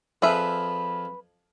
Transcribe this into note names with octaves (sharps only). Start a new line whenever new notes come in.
F2 F3 G#4 B4 E5